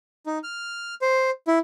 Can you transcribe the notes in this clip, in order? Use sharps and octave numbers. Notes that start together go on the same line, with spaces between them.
D#4
F6
C5
E4